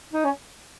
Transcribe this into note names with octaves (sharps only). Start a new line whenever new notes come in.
D#4
C#4